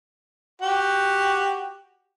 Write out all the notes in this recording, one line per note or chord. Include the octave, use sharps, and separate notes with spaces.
F#4 G4